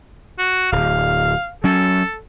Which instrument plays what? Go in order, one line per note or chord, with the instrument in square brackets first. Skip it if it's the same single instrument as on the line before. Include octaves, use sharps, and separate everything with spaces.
[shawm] F#4
[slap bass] D1 [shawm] F5
[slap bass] F#3 C#4 [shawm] A4